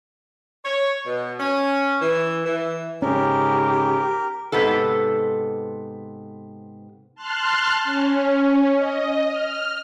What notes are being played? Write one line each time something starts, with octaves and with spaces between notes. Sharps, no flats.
C#5
B2
C#4
E3
E3
G#2 C#3 C#4 G4 A#4
G#2 C3 B3 A4
A5 C6 F6 F#6
C#4
D#5
F6